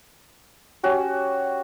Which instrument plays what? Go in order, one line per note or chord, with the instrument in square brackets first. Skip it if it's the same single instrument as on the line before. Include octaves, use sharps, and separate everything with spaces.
[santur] C#4 F#4 G4